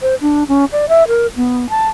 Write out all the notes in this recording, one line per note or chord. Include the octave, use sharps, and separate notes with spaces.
C5
D4
C#4
D5
E5
A#4
B3
A5